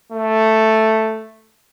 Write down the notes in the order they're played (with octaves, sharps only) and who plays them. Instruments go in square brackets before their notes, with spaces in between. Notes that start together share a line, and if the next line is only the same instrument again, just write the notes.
[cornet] A3